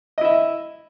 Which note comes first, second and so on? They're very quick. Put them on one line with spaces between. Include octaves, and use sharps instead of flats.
D#5 E4 E5